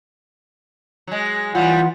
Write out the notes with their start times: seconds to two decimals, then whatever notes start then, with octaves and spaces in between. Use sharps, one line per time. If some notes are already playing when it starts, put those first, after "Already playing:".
1.07 F#3 G#3
1.55 A#2 E3 F#3 G3 F4 F#5